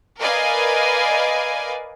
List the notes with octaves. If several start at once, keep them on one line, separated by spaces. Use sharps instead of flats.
A#4 B4 D5 D#5 F5 G#5